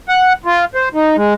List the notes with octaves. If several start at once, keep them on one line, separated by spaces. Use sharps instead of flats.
F#5
F4
C5
D#4
G#3